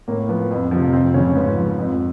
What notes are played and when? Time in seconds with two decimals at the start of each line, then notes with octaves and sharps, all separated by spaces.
0.08 A2 A#3
0.29 F3 B3
0.51 F2
0.71 C3 F3
0.93 F2 C4
1.14 C#3 F3 C#4
1.35 G#2 B3
1.57 F3
1.78 F2